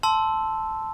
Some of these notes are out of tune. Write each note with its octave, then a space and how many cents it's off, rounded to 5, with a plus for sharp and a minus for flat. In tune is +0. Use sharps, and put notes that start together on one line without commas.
A5 +0 C6 -5 E6 +0